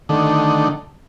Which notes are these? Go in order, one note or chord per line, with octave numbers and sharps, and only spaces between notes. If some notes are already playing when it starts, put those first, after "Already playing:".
D3 D#3 A3